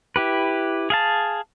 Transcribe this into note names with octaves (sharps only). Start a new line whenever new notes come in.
E4 G4 B4
G#4 F5 A5